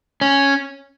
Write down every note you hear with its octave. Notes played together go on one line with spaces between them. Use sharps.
C#4